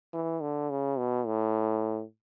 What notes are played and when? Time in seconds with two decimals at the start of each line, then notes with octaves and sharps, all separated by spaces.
0.13 E3
0.42 D3
0.70 C#3
0.98 B2
1.27 A2